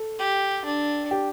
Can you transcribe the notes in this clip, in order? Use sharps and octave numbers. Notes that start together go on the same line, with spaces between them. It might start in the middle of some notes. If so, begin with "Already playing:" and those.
Already playing: A4
G4
D4
G4